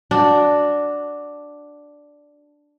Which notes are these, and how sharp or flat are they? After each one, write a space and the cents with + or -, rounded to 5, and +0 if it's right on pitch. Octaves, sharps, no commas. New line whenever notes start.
D4 +0 F#4 +0